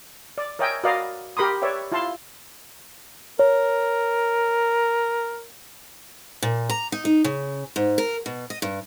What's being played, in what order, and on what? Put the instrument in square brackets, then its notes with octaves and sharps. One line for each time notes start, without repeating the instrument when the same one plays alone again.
[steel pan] D5
A#4 C#5 D#5 E5 G5 G#5
F#4 A#4 B4 D5 D#5 F5
G4 A#4 B5 C6 D#6
B4 C#5 D5 E5 G5
E4 F4 F5 A5 C6
[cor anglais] A#4 [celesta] C#5
[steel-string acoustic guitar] A#2
A#5
D#4
D#4
C#3
G#2
A#4
B2
D#5
G2